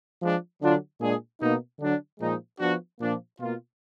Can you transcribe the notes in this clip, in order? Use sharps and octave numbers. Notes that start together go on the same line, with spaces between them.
F3 G#3 D4
D3 F#3 D4 F4
A#2 G#3 D4 G#4
B2 A#3 D#4
D3 F#3 D4
A#2 F3 G#3 D#4
F3 B3 D4 F#4
A#2 F3 A#3 D4
B2 A#3 F4